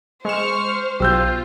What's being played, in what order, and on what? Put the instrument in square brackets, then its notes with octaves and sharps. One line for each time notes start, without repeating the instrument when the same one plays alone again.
[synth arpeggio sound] G#3 E7 [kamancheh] C5 [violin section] C#6 F6
[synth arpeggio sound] B1 [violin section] F4 [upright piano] G4 E6 G6